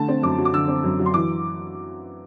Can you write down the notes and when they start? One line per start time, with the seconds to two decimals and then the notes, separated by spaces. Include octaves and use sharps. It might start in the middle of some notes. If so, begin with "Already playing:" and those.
Already playing: D3 A3 A5
0.08 C4
0.23 F#2 D6
0.38 F#3
0.45 D6
0.53 D3 E6
0.68 C4
0.83 F#2
0.99 F#3
1.06 C6
1.14 E3 D6